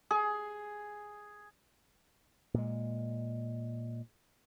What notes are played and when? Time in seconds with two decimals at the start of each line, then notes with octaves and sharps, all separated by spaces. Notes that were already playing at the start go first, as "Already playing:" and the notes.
0.11 G#4
2.54 A#2 G#3